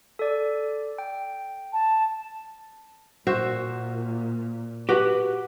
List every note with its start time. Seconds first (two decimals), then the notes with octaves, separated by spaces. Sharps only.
0.19 A4 D5
0.98 G5
1.73 A5
3.27 A#2 F#4 C5 E5
4.89 F#4 G4 B4 F#5